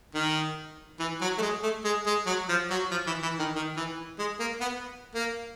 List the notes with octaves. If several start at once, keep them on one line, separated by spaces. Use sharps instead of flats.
D#3
E3
F#3
A3
G#3
A3
G#3
G#3
F#3
F3
F#3
F3
E3
E3
D#3
D#3
E3
G#3
A#3
B3
A#3